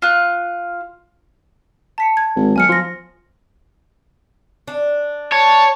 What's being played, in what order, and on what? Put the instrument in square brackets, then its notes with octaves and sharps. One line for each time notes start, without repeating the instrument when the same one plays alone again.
[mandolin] F4 F#6
[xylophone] A5 B6 C#7
G#6
[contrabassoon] G#1
[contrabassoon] B1 [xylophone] G#5 F6 C#7
[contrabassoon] F3 [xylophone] C6 A#6
[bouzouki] D4
[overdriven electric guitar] C#5 [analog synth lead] A5